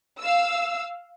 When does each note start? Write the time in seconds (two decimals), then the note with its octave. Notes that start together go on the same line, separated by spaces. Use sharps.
0.20 F5 E6